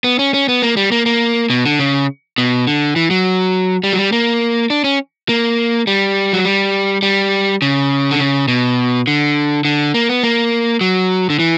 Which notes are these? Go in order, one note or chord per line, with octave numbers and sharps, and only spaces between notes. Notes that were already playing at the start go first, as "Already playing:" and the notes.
B3
C#4
C#4
B3
A#3
G3
A#3
A#3
B2
D3
C#3
B2
D3
E3
F#3
G3
F#3
G3
A#3
D4
C#4
A#3
G3
F#3
G3
G3
C#3
D3
C#3
B2
D3
D3
A#3
B3
A#3
F#3
D3
E3